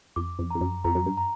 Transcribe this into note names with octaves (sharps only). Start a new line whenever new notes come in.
F2 D6
F2
F2 A#5
F#2
F2 A#5
F#2
G2
A#5